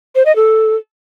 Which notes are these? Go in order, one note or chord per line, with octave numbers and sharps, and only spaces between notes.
C5
D#5
A4